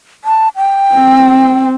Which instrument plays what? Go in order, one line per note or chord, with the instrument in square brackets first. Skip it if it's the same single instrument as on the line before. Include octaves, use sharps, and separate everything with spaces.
[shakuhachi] A5
G5
[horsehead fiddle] C4